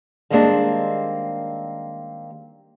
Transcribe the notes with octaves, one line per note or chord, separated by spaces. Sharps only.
D#3 G3 G#3 A#3 C4 D4